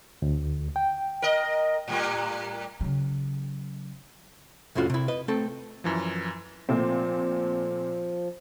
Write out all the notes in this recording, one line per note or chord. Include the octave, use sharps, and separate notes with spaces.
D2
G5
A#4 D#5
A2 G3 A#3
C#3 F#3
C2 F2 A2 C#4 F4 F#4
C3 E4
B4 D#5
A3 C4 A4
F#2 E3 F3
A#2 F3 A3 C4